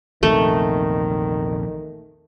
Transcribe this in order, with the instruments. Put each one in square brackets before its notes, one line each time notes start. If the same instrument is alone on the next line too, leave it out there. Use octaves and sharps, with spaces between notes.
[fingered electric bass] A#1 E2 C3 [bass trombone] D#3 [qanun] A3